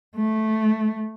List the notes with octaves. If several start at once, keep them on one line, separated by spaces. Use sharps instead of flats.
A3